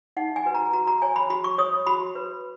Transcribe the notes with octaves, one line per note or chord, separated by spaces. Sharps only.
D#4 F#5
G#5
F#4 B4
A#5
F#4 A#5
A#5
C#5 G#5
B5
F#4 B5
C#6
C#5 D#6
F#4 B5
B4